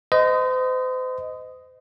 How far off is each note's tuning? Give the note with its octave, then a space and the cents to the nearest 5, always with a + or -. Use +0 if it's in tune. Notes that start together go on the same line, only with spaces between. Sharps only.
C5 -40 D#5 +0